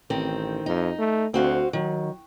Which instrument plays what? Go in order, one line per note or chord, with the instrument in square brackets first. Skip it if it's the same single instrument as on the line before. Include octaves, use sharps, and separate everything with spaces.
[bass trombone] A1 [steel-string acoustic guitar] D#3 C4
[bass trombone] F2 [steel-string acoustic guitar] D#4
[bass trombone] A3
[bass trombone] D2 [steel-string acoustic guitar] C4 F#4 F5
[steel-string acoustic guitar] D#3 [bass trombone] F#3